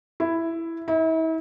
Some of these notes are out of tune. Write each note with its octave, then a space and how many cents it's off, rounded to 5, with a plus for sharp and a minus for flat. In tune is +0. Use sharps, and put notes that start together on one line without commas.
E4 +5
E4 -40